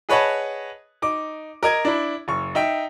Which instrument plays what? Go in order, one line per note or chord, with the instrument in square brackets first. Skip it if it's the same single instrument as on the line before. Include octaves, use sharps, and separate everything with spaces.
[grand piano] G#4 B4 C#5 D#5 F#5 A5
D#4 D6
A#4 D#5 G#6
D4 E4
F#1 C#6
D#4 E5 G5